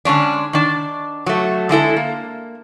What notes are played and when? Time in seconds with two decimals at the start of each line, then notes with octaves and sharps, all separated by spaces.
0.05 D3 G#3 C#4 D4
0.53 D#3 D4
1.26 F#3 A3
1.69 D3 G#3 E4 A4
1.96 A#3